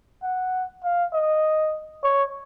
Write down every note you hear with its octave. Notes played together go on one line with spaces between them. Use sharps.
F#5
F5
D#5
C#5